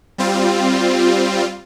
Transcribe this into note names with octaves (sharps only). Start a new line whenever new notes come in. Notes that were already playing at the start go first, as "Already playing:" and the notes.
G3 C4 F4